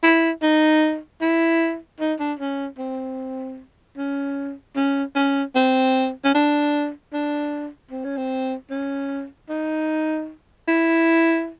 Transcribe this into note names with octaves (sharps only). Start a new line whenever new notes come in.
E4
D#4
E4
D#4
D4
C#4
C4
C#4
C#4
C#4
C4
C#4
D4
D4
C4
C#4
C4
C#4
D#4
E4